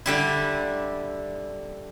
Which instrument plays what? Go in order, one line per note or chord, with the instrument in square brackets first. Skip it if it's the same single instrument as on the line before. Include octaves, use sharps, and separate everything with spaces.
[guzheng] D3 G3 E4